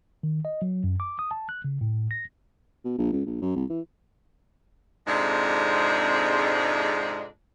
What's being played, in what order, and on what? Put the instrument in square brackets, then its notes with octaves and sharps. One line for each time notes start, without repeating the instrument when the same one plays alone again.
[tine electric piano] D#3
D#5
F#3
F#2
D6
D#6
A5
F#6
C#3
A2
A#6
[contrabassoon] B2
A#1
C#2
A#1
F#2
C2
E3
[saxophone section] F2 G#2 C3 G#3 D4